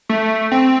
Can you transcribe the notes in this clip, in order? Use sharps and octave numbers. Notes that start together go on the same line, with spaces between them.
A3
C4